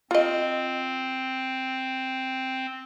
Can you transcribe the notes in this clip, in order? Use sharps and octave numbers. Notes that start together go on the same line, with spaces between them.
C4 F4 D#5